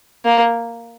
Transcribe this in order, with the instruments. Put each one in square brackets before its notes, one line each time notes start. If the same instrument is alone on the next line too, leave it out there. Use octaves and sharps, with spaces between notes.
[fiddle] A#3